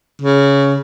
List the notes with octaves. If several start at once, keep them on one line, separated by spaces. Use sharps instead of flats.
C#3